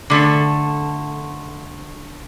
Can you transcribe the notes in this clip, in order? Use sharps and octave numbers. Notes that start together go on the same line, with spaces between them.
D3 A3 A4